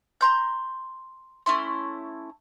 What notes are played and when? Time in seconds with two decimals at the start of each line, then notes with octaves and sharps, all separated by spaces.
0.21 A#5 C6 G6
1.46 A3 C#4 E4 C6